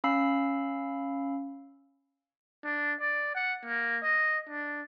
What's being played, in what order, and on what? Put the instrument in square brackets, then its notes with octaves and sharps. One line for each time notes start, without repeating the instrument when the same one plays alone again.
[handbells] C#4 F5 B5 E6 C7
[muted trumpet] D4
D5
F#5
A#3
D#5
D4